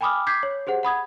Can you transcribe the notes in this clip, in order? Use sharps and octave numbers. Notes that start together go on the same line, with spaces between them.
G5 G#5 B5 D6 D#6 F6
D6 G6 G#6 B6 C7
C#5
G4 G#4 C5 F#5
F#5 B5 D#6 G#6